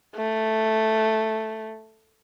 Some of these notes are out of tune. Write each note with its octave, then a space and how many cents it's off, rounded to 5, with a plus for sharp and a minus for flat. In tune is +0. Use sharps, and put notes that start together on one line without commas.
A3 +0